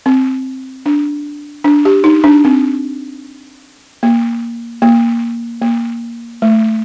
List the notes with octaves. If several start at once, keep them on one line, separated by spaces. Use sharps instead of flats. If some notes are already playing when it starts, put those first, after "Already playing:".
C4
D4
D4
G4
D#4
D4
C4
A#3
A#3
A#3
A3